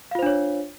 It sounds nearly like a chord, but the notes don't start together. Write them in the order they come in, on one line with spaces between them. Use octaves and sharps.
F5 F4 C5 D4 C#5